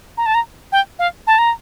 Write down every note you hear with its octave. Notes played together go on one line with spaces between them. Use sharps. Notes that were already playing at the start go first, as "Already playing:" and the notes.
A#5
A5
A#5
G5
F5
A5
A#5